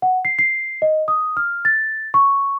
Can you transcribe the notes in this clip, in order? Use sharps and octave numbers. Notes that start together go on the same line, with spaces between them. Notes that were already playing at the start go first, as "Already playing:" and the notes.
F#5
C7
C7
D#5
D#6
F6
A6
C#6